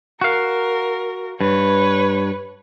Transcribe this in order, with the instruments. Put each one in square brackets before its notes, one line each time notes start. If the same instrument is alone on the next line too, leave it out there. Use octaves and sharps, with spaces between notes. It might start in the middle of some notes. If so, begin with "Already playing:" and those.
[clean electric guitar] F#4 F5 [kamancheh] A#4
[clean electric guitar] G2 [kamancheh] B4 C#5